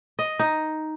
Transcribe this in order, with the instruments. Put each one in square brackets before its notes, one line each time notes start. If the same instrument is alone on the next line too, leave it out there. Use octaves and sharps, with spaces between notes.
[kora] D#5
D#4